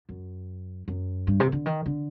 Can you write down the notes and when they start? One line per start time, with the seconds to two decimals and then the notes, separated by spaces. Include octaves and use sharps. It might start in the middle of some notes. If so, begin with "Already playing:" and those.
0.09 F#2
0.88 F#2
1.27 G2
1.40 C3
1.52 D3
1.66 D#3
1.86 D3